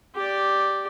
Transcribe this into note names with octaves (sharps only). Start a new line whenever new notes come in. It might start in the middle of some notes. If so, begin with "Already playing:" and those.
G4 D5